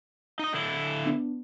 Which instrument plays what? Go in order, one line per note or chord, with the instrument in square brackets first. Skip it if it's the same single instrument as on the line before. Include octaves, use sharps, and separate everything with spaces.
[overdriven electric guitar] D#4 D#5
D3 E4
[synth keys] B3 D4